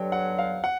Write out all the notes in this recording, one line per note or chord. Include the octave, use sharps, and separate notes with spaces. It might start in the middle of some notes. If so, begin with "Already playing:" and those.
Already playing: G2 D3 F#3 C#5 G5
F#5
F5
F#5